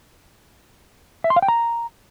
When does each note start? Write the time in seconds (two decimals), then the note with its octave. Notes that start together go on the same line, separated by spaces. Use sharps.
1.24 E5
1.30 C6
1.36 F5
1.42 G5
1.48 A#5